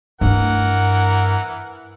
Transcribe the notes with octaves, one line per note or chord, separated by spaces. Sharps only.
G2 E3 A3 A#4 F#5